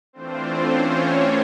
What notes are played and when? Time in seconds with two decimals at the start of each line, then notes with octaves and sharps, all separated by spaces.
0.13 E3 A3 C4 D4 F4 C5
0.65 C#4 C#5